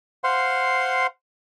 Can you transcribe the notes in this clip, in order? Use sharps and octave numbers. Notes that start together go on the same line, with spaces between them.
C5 F5 F#5 C6